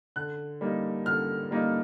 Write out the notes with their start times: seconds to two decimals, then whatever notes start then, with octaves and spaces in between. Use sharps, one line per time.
0.16 D3 F#6
0.61 G3 A#3 D#4
1.06 D3 F6
1.51 G3 A#3 D#4